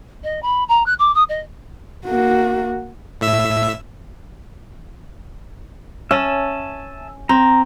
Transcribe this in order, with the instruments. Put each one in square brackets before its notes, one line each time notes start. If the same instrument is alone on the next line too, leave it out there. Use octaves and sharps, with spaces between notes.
[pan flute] D#5
B5
A#5
F#6
D6
D#6
D#5
[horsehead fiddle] A#3 F#4
[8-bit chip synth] A2 E5 E6
[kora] C#4 [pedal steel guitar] E5 G#5 A5
[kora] C4 [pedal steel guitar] A#5